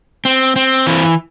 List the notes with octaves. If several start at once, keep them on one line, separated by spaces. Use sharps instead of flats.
C4
C4
E3